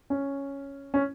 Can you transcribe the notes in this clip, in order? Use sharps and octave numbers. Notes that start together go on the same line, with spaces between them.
C#4
C#4